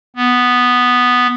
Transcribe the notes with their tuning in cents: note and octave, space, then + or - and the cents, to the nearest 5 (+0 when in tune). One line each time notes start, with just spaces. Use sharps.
B3 +0